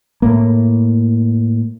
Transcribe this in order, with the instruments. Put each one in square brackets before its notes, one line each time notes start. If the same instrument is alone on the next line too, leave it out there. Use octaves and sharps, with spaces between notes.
[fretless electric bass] A2 A#3